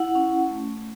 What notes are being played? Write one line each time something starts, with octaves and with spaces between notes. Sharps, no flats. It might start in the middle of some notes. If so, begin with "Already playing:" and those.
Already playing: E4 F#5
C#4
A3